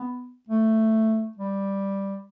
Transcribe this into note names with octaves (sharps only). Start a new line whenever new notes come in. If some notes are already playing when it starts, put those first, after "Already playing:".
Already playing: B3
A3
G3